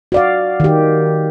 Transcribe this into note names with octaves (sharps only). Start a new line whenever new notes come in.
F#4 D5 F5
D#3 G4